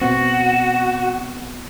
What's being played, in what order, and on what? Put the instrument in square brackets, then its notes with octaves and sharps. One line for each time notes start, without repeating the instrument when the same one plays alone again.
[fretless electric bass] B2 B3 C4 [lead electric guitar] F#4